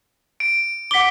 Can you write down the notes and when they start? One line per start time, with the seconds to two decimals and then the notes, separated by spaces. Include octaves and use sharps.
0.40 D7
0.91 F#5 D6 B6 G7